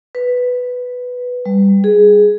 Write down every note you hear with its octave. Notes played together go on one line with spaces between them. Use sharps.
B4
G3
G#4